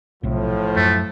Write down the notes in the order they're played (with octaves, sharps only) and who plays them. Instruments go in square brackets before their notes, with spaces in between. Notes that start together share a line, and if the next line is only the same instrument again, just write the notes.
[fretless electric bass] B1 C3 [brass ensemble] A2 F3
[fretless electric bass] F#2 [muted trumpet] A3